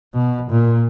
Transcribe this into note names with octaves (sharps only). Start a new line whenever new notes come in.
B2
A#2